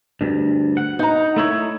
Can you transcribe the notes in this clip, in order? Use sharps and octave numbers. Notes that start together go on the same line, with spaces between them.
D2 G2
F#5
D#4 A#5
A3 E4 C#5